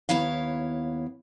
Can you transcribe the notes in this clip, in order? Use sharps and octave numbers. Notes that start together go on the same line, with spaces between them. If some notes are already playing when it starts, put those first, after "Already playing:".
D#2 B3 E4 C#5 F5